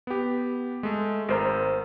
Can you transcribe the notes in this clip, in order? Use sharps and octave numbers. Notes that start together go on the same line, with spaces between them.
B3 G4
G#3 A3
G#1 A#4 C5 A#5